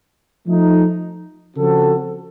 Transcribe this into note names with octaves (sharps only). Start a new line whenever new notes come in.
F3 A3 D#4
C#3 F3 C4 F#4 A4